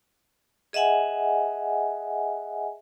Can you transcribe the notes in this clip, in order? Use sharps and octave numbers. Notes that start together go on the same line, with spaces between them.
G#4 D#5 E5 F#5 G#5